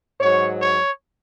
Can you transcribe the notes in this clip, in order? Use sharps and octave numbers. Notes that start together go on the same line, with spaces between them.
G#2 F#3 C#5
C#5